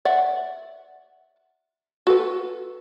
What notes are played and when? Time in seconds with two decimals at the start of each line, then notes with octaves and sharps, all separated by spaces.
0.05 D5 E5 F#5
2.07 F#4 A4 B4